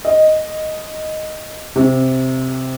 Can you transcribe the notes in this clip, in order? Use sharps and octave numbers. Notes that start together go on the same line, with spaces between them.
D#5
C3